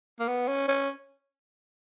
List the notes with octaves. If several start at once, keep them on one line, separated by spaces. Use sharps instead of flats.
A#3
B3
C#4
C#4